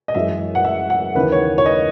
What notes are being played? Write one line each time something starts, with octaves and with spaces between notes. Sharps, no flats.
D#5
F#2 E3 G#3 E5
F#5
E5
F#5
D#2 C#3 E3 B4
C#5
C#5
D#5